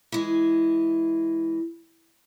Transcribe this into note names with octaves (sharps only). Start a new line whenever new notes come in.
E3 G#3